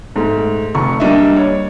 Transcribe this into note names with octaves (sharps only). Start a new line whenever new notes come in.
G#2 A3
F1 C#6
G3 A#3 D4 D#5 E5
C#5